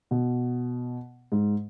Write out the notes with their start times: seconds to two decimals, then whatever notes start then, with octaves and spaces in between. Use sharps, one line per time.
0.11 B2
1.32 G#2